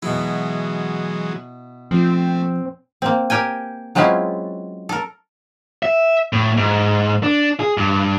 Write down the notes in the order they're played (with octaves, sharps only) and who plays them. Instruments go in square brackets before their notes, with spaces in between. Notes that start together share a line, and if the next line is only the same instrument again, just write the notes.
[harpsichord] B2 E4 [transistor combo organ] E3 F#3 G#3
[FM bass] F3 [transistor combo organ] A3 [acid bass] C4
[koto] A#3 C4
G4 A#4 G5 G#5
F#3 G#3 C4 C#4 E4 F4
A4 A#4
[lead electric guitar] E5
A2
G#2
D4
G#4
G2